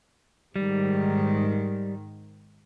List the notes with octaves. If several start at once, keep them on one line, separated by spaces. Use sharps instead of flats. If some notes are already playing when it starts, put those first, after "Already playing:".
G#2 D#3 G3